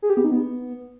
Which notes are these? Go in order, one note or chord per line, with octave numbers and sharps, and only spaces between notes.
G#4
G4
B3
D#4
B3